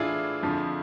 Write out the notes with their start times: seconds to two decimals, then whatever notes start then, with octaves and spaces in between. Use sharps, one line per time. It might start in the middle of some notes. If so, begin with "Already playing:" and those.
Already playing: A2 E3 D4 E4 F4 G#4
0.43 F2 D3 F3